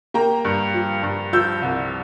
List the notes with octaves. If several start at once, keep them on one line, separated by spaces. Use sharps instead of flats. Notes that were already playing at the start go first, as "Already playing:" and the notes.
A#3 G5 A#5
G2
F3
G2
F3 E6 G6
C2